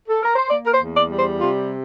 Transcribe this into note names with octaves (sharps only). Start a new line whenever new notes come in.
A4
A#4
C5
A#3 D5
A#4
C5
E2
D5
G3
C5
C3 F4